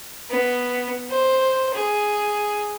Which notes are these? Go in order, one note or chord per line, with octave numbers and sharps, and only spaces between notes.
B3
C5
G#4